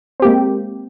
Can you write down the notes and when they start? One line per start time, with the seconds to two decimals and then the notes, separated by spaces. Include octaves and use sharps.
0.20 C4
0.22 G4
0.25 A#3
0.28 G#3